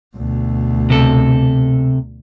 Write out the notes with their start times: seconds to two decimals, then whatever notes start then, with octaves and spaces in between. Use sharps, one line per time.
0.17 D2 B2
0.90 C3 A4